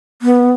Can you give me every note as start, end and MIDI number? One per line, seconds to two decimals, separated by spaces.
0.22 0.51 59